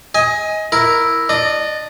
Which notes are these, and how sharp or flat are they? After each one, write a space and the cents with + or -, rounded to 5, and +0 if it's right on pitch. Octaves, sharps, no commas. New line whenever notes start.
D#5 +25 G#5 +0
E4 +0 A#4 +0
D4 +0 D#5 -20